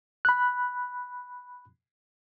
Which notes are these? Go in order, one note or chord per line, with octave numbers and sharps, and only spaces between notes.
B5 F#6